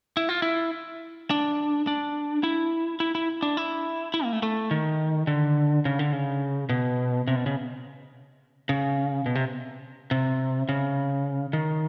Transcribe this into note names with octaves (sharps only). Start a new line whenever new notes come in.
E4
F4
E4
D4
D4
E4
E4
E4
D4
E4
E4
A#3
A3
A3
D#3
D3
C#3
D3
C#3
B2
C3
B2
C#3
C#3
B2
C3
C3
C#3
D#3